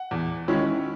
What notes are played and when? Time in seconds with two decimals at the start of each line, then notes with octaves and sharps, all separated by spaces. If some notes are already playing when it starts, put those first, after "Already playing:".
Already playing: F#5
0.11 E2
0.48 D#3 G#3 C#4 E4